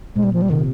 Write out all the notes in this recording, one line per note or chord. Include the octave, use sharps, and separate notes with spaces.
A#2 G#3
G3
F3
G3
C3 D#3